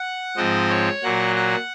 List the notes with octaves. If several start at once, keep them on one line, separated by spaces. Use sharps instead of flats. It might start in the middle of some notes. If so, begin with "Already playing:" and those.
Already playing: F#5
G#2 F3 C4 D#5
C#5
A#2 F#3 A#3 F#5
F#5